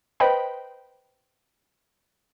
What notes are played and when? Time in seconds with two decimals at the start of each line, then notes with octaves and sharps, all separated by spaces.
0.20 B4 C5 D#5 G5 B5